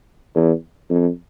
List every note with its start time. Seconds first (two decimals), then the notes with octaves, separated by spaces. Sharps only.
0.35 E2
0.90 F2